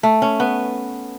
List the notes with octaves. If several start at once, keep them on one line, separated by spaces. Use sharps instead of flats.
A3
C#4
B3